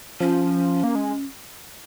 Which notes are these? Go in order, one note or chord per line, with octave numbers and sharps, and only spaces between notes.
F3 C#4
A#3
G#3